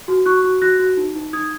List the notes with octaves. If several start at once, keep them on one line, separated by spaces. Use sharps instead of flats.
F#4
F#4 C#6 F#6
F#4
F#4 F#6 A#6
F#4
D#4
D#4
D#4 D#6 G#6